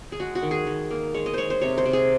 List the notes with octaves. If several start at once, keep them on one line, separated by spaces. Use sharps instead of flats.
G#4
G#3 F#4
F#4
D#3
G#4
D#3
A#3
G#3 C#5
D#5
G#3 C5 C#5
C5
C3 C#5
C5
C3
G#4